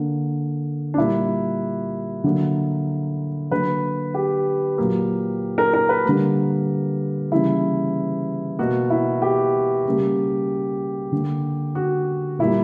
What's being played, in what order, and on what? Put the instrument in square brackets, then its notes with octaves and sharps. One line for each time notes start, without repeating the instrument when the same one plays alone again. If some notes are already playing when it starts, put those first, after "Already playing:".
Already playing: [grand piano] D3 A#3
D4
A#2 G3 A#3 E4
D3 F#3 A#3
D3 F#3 A#3 B4
G4
A#2 F#3 A#3
A#4
A#4
B4
D3 G3 A#3
C#3 E3 G3 A#3 E4
B2 A#3 F#4
E4
G4
C#3 G3 A#3
D3 A#3
F#4
A#2 G3 A#3 E4